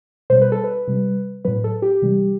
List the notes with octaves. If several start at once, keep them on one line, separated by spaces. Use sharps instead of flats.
B2 G3 C5
B4
A4
B4
C3 G3
A2 F#3 B4
A4
G4
C3 E3 G3